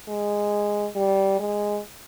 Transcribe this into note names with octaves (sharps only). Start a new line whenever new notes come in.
G#3
G3
G#3